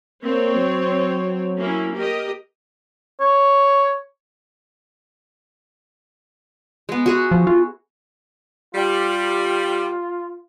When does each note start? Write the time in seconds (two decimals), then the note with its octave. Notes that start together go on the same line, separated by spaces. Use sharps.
0.24 A#3 C4 C#5
0.56 F#3
1.58 A#3 C#4 E4
1.95 G4 A#4 D#5
3.21 C#5
6.89 G#3 B3
7.06 F#4 G#4 E5
7.31 F3
7.47 F4
8.75 G3 F4